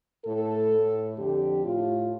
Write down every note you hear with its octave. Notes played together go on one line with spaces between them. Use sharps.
A2 A4
A2
F2 D3 G4
A2 F4